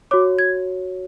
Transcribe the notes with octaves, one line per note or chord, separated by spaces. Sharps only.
F#4 C#5 D6
G#6